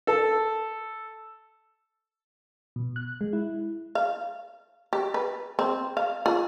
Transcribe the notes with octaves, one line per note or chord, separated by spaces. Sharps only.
A4
B2
F#6
G#3
E4
F5
G4
B4
C4
F5
F4